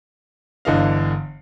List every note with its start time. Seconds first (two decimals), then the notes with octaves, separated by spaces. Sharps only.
0.65 G1 D3 E3 D#5 F5